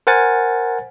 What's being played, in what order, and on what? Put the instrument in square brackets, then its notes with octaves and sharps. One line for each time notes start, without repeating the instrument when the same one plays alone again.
[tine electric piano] A#4 C5 F#5 G#5 A6